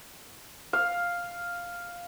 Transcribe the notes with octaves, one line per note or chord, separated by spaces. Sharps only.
F5